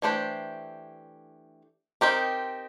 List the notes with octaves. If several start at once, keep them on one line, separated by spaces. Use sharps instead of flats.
E3 A3 D4 G4 C5
C4 D#4 G4 A#4